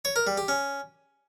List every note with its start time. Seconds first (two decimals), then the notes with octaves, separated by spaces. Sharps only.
0.05 C#5
0.16 A#4
0.27 G3
0.38 G4
0.48 C#4